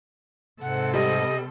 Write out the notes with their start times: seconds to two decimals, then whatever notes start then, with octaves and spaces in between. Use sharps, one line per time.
0.62 G#2 C3 A4 F#5
0.94 G3 D#5